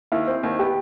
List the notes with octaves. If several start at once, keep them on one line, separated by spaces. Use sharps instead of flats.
D#2 E4
C4
D#2
B3 G4